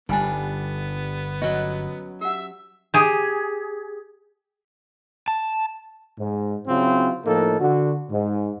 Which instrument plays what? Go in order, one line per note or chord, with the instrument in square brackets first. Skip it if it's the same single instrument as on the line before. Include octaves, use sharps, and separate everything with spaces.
[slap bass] G1 [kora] G3 D4 [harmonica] B3 [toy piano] D#4 G#5
[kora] F#3 C#4 F#4 [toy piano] D#5
[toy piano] G4 F#5 [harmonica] E5 E6
[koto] G4 G#4
[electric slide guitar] A5
[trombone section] G#2
C#3 F#3 C4 E4 F4
A2 F3 A#3 D#4 A4
D3 F#4
G#2